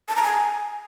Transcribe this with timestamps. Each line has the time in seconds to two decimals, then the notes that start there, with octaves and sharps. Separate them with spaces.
0.08 A5
0.16 A#5
0.23 G#5